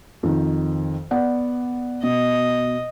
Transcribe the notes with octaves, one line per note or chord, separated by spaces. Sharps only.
F2 D#3
B3 D5 F#5
B2 D#5